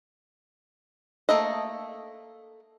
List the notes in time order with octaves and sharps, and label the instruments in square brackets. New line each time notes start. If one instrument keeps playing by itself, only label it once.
[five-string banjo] A3 A#3 A4 D#5